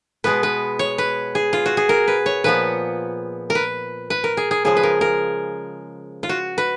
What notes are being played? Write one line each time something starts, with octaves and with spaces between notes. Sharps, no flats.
B2 G#3 B3 B4
B4
C#5
B4
G#4
F4
F#4
G#4
A#4
B4
C#5
A#2 F3 B3 B4
A#4
B4
B4
A#4
G#4
G#4
C#3 F3 G#3 G#4
B4
A#4
A#4
F4
F#4
B4